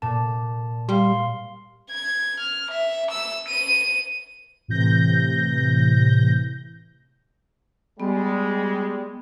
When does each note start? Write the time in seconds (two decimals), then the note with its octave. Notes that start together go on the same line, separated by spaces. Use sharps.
0.02 A#2 A5
0.89 G3 F5 C6
1.90 G#6
2.40 F6
2.71 E5
3.11 E6
3.48 D#7
4.68 A2 C3 E3 G6 A#6
8.00 G3 G#3 B3